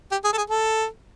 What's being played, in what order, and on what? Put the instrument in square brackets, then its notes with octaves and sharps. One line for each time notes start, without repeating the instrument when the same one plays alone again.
[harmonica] G4
G#4
A4
G#4
A4